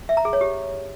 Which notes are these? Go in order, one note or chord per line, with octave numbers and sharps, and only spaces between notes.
E5
A#5
G#4
C#5
G4